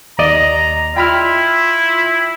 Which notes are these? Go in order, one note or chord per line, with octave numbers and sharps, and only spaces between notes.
D#2 D5 D#5 A#5
E4 F4 G5 B5 F6